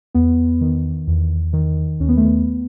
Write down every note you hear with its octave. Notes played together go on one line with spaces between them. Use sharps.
E2 B3
D#3
E2
D#3
D#2 C#4
B3
A3
B3